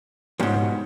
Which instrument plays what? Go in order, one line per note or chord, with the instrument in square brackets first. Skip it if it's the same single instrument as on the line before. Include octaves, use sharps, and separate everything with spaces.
[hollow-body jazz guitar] E2 G#2 [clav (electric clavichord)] F3 G3 C#4
[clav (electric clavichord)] B2